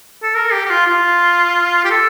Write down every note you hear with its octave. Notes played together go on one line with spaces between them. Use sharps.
A4
A#4
G4
G4
F4
F4
G4
A4